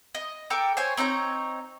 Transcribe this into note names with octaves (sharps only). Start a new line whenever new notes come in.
D#5
A4 A#4 G5 D6
C5 C#5 G#5
C4 D#4 C#5 A#5